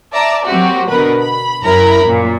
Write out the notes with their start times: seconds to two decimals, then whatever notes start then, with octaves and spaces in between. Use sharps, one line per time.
0.13 D5 E5 A5 A#5 D6
0.45 F#3 A#3 C4 F#4 G4
0.90 B2 D3 A#4 B4 B5
1.20 B5
1.63 F#2 E4 A#4 A#5 B5
2.03 F#2 A#2